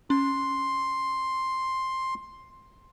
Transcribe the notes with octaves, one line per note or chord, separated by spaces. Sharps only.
C#4 C6